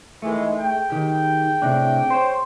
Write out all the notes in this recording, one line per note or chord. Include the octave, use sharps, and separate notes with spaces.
D#3 E3 G#3 A3
G#4 G5
D#3 G4
A2 C3 D4
C5 C#5